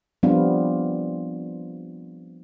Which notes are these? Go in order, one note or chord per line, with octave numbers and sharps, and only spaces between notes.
F3 G3 B3 C4 D4 F4